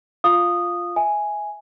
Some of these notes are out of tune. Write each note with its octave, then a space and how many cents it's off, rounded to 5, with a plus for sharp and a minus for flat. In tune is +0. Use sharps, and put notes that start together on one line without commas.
F4 +0 F5 +0 D#6 -10
E5 -10 G#5 +0